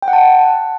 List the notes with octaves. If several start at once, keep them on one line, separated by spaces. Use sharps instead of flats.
G5
F#5
A5